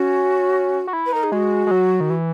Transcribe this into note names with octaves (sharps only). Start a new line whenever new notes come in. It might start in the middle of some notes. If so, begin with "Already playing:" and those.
Already playing: C#4 F#4
F#4
E4
B4
D#4 A#4
G#4
G#3 F#4
G#3
F#3
D#3
E3